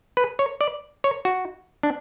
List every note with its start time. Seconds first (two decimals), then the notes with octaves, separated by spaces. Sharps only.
0.17 B4
0.39 C#5
0.61 D5
1.04 C#5
1.25 F#4
1.83 D4